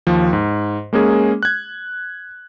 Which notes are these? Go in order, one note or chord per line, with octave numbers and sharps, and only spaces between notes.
D#2 F3
G#2
G#3 A#3 C#4 G#4
F#6 G#6